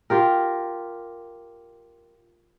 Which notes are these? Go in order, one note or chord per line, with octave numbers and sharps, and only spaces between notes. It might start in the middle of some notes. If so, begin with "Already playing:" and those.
F4 G4 A#4